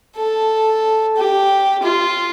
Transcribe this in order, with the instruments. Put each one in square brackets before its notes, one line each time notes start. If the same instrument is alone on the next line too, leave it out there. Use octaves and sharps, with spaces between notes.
[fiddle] A4
G4
F4